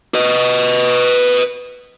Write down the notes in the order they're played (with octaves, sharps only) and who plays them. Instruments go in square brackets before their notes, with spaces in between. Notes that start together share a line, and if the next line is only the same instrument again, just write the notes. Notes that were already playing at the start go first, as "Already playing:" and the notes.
[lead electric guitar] B4 D#5